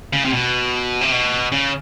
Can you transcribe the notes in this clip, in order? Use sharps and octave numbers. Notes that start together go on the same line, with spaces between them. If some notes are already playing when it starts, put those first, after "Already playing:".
C#3
C3
B2
C3
B2
C#3